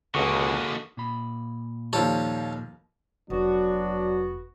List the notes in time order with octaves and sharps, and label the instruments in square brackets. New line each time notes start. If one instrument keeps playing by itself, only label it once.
[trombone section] C#2 [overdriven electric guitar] D3 A#3 [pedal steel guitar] F#4 G#4 F#5
[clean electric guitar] A#2 B5
[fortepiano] D#2 F3 G3 [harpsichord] A4 C#5
[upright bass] F1 [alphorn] F#3 [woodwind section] B3 F#4 [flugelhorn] D4